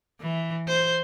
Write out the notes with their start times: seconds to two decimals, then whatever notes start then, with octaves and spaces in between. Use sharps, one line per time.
0.21 E3
0.68 C5